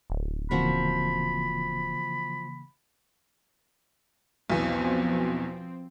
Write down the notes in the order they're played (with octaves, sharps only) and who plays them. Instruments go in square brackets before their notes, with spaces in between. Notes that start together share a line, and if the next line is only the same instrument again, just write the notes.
[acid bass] D1
[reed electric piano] C#3 E3 A#3 [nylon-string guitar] F3 C4 F#4 [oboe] B5
[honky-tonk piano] B1 E2 B2 [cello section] F3 C4